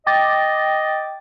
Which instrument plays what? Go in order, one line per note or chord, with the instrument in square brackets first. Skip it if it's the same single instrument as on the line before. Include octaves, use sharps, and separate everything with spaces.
[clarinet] D#5 [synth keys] G5 D6 A6